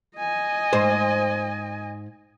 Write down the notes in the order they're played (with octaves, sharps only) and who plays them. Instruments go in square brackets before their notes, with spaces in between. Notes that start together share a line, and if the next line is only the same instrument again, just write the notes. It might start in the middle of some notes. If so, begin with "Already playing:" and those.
[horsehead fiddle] D#5 G#5
[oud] G#2 C5